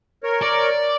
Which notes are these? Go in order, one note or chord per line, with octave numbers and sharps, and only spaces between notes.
A#4 C#5
D5